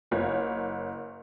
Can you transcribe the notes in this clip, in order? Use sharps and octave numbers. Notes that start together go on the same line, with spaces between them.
F#1 C#5